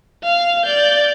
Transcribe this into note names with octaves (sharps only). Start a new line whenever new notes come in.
F5
D5 G6